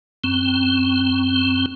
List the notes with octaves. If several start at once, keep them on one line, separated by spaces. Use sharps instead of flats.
F#2 C4